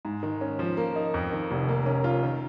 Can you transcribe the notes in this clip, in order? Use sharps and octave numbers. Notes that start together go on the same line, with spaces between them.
G#2
D#3
C#4
F3
A#3
D#4
F2
D#3
F1
A#3
C#4
F4
D#3